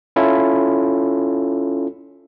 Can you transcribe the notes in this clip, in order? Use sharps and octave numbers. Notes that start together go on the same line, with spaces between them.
C#4 E4 F4 A4